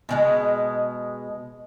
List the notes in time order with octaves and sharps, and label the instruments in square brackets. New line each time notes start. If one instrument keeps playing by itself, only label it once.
[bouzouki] B2 D#3 G#3